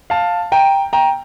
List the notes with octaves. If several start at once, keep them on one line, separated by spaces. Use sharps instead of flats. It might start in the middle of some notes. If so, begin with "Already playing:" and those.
F5 A5
G5 A#5
G5 A#5